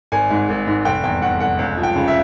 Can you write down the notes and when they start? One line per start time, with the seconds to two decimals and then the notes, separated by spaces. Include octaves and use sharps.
0.12 G#1 G#5
0.30 G#2
0.49 G#1
0.67 G#2
0.85 F1 G5
1.04 E2 G5
1.22 E2 F#5
1.40 F1 F#5
1.59 C#2
1.77 F3
1.83 G5
1.96 C#3
2.08 E5